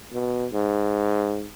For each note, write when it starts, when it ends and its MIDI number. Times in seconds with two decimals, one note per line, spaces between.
0.13 0.46 47
0.53 1.48 44